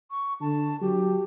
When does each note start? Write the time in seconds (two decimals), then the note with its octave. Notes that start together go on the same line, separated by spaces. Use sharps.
0.11 C#6
0.41 D3 A5
0.81 F#3 G4